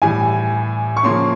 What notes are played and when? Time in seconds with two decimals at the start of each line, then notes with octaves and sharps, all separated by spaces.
0.02 A2 E3 G3 G#5
0.97 C#6
1.03 C#3 F3 A#3 C#4 C6